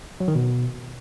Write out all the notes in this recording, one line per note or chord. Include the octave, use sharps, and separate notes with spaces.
F#3
D#3
B2